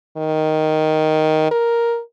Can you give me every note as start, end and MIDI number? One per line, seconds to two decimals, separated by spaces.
0.17 1.50 51
1.51 2.00 70